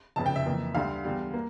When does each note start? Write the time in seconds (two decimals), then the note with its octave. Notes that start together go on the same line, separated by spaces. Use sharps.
0.16 F1 F2 C#3 A5
0.26 G5
0.36 E5
0.46 F2 E3 A#3
0.75 D2 D3 G3 F5
1.04 E2 D3 G3
1.34 A#3